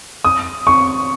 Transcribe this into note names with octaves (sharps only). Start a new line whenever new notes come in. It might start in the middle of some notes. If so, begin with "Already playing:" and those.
D#6
C#6